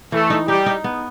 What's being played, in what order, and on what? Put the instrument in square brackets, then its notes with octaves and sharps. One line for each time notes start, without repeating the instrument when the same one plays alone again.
[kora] E3 [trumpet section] A3 A4
[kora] D#4
[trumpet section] G3 G4 [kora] D#4
[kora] D#4
B3